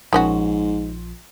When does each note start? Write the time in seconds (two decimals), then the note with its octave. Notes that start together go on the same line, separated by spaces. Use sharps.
0.13 A#1 G#2 D#3 F3 C#4 F#4